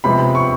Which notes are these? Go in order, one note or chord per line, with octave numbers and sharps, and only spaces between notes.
C3 F3 G#3 B3 B5
C#6